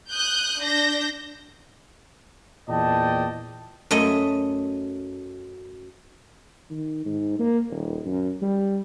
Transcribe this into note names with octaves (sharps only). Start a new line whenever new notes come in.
D#6 F#6 G6
D4 G6 A#6
E2 A#2 D5 D#5 G5 A5
F#2 A3 D#5
D#3
G#2
A#3
D#1
F#2
G3